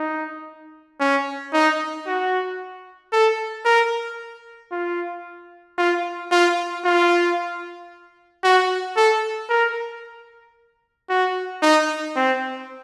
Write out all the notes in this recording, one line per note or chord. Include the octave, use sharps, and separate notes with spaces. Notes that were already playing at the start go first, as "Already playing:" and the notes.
Already playing: D#4
C#4
D#4
F#4
A4
A#4
F4
F4
F4
F4
F#4
A4
A#4
F#4
D#4
C4